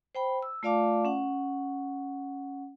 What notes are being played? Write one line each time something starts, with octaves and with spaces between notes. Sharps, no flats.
C5 G5 B5
E6
A3 F4 D5 F5 A5 D6
C#4 F#5